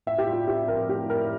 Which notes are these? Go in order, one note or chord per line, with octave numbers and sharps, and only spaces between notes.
A2 E5
G4
G3 F4
C4 G4
A#1 A#4
A2 G4
G3 A#4